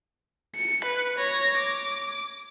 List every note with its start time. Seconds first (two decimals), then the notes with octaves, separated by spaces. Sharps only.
0.55 C#7
0.85 B4
1.18 C#5 A#6
1.58 D6